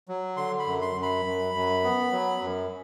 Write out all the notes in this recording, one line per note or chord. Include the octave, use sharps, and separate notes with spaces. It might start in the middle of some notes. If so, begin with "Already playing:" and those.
F#3
D3 C6
B5
F#2
C6
F#2
B5
F#2
F#2
B3
F#3
F#2